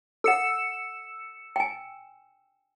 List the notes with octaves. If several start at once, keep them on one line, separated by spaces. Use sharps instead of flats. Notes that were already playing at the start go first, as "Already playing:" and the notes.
A4 F#5 E6 C#7 E7
G5 G#5